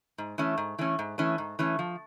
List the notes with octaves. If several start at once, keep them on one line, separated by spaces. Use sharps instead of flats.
G#2
E3 A3 C#4
G#2
E3 A3 C#4
G#2
E3 A3 C#4
G#2
E3 A3 C#4
F3